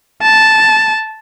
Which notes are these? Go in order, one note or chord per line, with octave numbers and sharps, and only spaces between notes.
A5